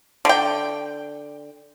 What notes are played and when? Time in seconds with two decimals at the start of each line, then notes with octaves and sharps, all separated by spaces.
0.25 D3 G5